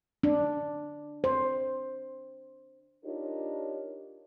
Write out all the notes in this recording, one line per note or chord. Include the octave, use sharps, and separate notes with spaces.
D4
C5
D4 D#4 F4 G4 A#4 C#5